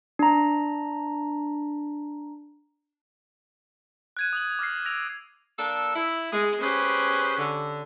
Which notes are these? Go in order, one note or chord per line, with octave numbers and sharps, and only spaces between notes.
D4 A#5
F#6 G#6 D#7
D#6 F#6 F#7
D6 F6 A#6 C7
E6 A#6 D7 F7
A#3 D4 A4
E4
G#3 G#4
C#4 G4 G#4 B4 C5
D3